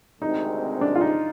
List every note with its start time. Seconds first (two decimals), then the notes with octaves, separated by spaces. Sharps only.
0.22 D2 C3 D#3 G#3 C4 D#4
0.81 D4
0.95 F4
1.01 D#4